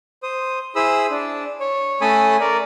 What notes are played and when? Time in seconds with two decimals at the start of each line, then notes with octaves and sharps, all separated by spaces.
0.23 C5 D#6
0.76 E4 G#4 C5 B5 D#6 E6
1.10 D4
1.60 C#5
2.01 A3 C#4 A4 G#5 B5 D#6
2.40 A#4 D5